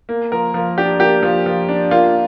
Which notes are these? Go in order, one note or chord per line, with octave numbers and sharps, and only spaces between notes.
A#3
F3 A#4
F3
D4 G4
A#3 G4
F3
F3
D4
A#3 F4